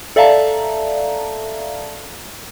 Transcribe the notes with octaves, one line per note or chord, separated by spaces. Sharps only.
A4 D5 E5 F5 A5 A#5